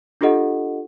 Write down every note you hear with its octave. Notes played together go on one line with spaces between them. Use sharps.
D4 F4 G4 A4 D#5 F#5